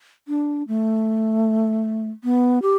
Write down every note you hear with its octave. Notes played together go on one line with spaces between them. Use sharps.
D4
A3
B3
G4